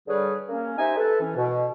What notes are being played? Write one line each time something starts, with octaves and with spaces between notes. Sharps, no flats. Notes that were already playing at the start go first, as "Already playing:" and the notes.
D3 G3 G#4 B4 C#5
A#3 C#4
D#4 G4 C5 E5 G#5
A4 B4
E3 C#4
B2